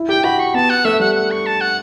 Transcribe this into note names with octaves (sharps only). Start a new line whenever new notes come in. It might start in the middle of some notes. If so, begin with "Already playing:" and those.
Already playing: E4
G4 G5
F#4 B5
C#6
B3 A5
F#5
A3 E5
G3 F#5
F#5
C#6
A5
F#5